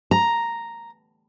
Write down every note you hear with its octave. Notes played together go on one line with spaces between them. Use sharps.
A#5